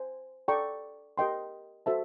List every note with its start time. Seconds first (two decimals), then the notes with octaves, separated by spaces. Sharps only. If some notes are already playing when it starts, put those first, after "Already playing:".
Already playing: C5 G#5
0.48 A4 D5 G5 A#5 C#6
1.18 G4 A#4 D#5 G5 C6
1.86 F#4 A4 C5 E5 A5